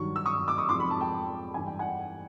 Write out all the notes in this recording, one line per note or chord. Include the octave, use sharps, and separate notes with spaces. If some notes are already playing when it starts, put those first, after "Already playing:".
Already playing: G2 D#3 F#3 C#6
E6
C#6 D#6
D6 E6
C#6 D#6
F2 C3 F3 G#3 C6 D6
B5 C#6
A5 B5
G5 A5
G2 E3 G3 G#5
G5
F#5 G#5